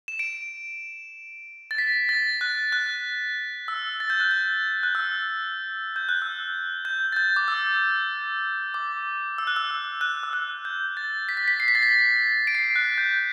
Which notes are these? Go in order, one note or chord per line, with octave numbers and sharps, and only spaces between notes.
E7
D7
A6
B6
A6
F#6
F#6
E6
A6
G6
F#6
G6
F#6
E6
G6
F#6
E6
G6
A6
G6
D6
E6
D6
E6
F#6
E6
E6
F#6
E6
F#6
G6
A6
B6
A6
B6
C7
B6
A6
B6
D7
C7
F#6
G6